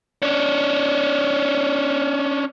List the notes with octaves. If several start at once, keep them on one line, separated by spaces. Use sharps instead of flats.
C#4 D4